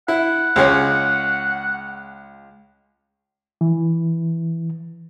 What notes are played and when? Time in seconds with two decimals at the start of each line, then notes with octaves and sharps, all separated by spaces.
0.08 E4 F#5
0.56 C#2 G#3 C#4
3.61 E3